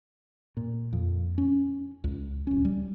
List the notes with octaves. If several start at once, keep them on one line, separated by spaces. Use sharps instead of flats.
A#2
F2
C#4
C#2
D1 C#4
G3